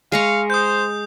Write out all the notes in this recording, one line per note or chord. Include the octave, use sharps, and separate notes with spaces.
G#3 F5 A#5 C#6
C5 D#6 G6